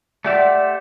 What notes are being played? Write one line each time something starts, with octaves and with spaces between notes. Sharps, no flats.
A3 G4 D5 E5 F#5 C6